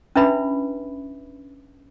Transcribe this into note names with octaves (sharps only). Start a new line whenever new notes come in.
C#4 D4 E4 B4 E5 B5